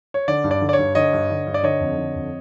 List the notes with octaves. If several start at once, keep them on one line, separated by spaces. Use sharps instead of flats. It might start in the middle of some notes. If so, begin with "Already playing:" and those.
C#5
D3 D5
G2
D5
D3
D5
C#5
G2
D3 C#5 D#5
G2
D3
G2
D5
D3 C#5 D#5
F2
D3
F2